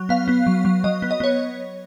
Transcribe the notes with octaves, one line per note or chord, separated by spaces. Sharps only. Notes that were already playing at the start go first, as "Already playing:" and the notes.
Already playing: F#3
B3 F5
B3
F#3
F#3
F#3 D#5
B3
D#5
B3 C#5